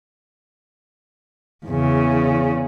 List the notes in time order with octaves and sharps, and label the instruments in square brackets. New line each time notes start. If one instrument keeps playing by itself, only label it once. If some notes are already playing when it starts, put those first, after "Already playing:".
[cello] E2 C#3